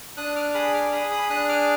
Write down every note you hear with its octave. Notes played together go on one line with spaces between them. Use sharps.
D4 D#6 F#6
D6 F6
G#4 B5 D#6
D6 F6
G#4 B5 D#6
B5 D#6
D4 D#6 F#6
D6 F6